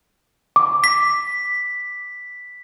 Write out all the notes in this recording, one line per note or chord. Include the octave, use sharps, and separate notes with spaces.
D6
B6